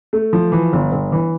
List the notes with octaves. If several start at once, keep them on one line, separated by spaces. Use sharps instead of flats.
A3
F3
E3
G1
G1
E3